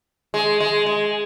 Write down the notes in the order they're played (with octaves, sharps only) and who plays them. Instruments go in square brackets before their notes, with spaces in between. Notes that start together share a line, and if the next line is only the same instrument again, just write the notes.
[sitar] G#3
G#3
G#3